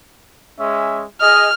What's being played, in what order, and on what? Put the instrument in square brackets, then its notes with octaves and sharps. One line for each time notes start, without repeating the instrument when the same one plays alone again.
[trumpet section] G#3 C#4 E5
[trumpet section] G#4 D#5 [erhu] F6